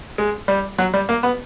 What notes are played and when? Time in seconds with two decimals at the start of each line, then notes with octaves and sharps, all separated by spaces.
0.18 G#3
0.48 G3
0.78 F#3
0.94 G3
1.09 A#3
1.23 B3